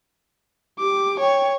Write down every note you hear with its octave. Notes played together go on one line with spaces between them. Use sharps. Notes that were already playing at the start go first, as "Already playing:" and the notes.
G4 D6
C#5 G5